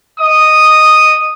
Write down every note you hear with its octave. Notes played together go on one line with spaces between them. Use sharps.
D#5 D#6